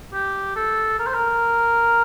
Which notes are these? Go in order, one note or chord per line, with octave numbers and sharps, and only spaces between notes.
G4
A4
A#4
C5
A#4